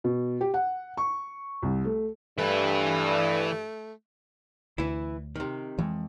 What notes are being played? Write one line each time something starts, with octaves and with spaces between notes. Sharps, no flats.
B2
G4
F#5
C#6
C2
A3
G2 E3 A3 B4
D2 E3 E4
C3 D#3
F2 E3 F3 G#3